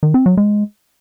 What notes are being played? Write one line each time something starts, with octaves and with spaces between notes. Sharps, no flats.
D#3
C4
F#3
G#3